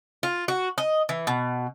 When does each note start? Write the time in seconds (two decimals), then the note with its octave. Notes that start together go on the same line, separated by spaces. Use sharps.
0.23 F4
0.48 F#4
0.78 D#5
1.09 E3
1.27 B2